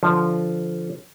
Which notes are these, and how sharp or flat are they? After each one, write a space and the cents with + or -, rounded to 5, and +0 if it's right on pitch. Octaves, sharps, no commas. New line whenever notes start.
D3 +0 F3 -10